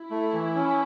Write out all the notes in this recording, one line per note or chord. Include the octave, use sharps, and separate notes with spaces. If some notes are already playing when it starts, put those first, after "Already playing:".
Already playing: E4
A3
E3
C#4